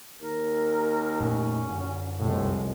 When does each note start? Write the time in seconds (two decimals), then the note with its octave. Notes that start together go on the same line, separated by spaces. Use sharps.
0.21 D#2 A#4
1.20 F2 A#2 A3 C#4
1.69 F#2 D3
2.19 F1 C2 A2 G#3